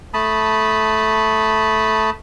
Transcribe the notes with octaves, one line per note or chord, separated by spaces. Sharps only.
A3 A5 B5 D#6